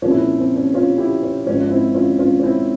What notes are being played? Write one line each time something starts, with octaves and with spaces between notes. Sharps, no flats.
C2 A#2 F3 C#4 F4
E4
C#4
C4
C#4
C#4 F4
E4 G4
C#4
G#1 G#2 F3 C#4
F4
C4 E4
C#4 F4
C#4 F4
C#4
C4 E4